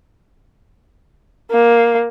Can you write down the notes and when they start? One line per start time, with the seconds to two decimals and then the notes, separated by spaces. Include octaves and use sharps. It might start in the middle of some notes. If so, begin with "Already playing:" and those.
1.52 A#3